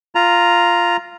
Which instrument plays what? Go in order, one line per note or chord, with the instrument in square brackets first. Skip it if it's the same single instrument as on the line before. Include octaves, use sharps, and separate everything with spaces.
[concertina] F4 A#5